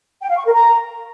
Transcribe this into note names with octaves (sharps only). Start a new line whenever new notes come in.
G5
F5
C#6
A#4
A#5